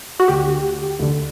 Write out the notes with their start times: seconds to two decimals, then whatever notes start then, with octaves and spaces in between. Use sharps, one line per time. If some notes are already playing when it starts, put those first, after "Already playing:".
0.20 F#4
0.28 D2 D3 G4
0.99 D2 D3